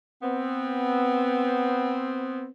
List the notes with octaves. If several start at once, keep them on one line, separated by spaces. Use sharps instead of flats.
B3 C4